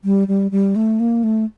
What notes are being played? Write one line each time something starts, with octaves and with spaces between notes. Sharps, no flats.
G3
G3
G3
A3
A#3
A3